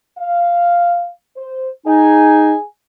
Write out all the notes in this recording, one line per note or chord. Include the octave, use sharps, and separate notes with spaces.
F5
C5
D#4 G#4 G#5